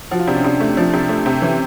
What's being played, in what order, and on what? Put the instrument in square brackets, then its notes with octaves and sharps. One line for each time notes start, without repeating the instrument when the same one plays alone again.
[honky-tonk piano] F3 [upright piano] F#4
[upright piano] F4
[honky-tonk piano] C3 [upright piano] D4
[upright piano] C#4
[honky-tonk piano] C3 [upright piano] D4
[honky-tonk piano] A3
[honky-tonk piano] F3 [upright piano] D4
[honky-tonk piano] C3
A3
C3
[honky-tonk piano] E3 [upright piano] C#4